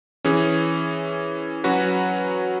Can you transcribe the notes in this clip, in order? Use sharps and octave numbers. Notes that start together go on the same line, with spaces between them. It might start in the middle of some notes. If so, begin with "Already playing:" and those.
E3 C#4 G#4
F#3 C#4 F#4 B4